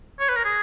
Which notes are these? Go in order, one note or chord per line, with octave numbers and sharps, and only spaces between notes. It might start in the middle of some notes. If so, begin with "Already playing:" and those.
C#5
B4
A#4
G#4